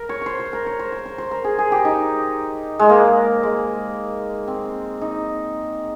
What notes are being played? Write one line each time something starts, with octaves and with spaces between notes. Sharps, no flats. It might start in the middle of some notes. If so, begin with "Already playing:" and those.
Already playing: A#4
C#5
C5 C#5
C5
A#4
C#5
C5
A#4
C5
C5
A#4
G#4
G#4
G4
D#4
G#3
A#3
G#3
C4
D#4